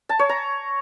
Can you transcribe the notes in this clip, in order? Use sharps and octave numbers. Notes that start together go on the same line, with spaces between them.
A5
C#5
A#5